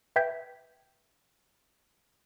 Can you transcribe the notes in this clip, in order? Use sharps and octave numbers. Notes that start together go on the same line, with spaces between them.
B4 E5 G5 G6 G#6 B6